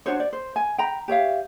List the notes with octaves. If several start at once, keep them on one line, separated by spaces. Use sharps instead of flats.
D4 F#4 C5 C#5
D5
C5
G#5
G5 A#5 B5
G4 C#5 E5 F5